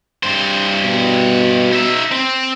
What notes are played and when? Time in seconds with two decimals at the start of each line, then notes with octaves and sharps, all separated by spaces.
0.23 G2 C5
0.84 B2
1.73 D#4 E5
2.12 C4